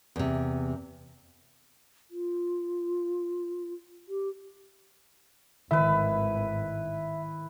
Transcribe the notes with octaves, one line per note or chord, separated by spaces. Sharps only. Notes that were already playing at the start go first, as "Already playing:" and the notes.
E2 C3
F4
G4
G#1 A2 D#3 E4 B4 E5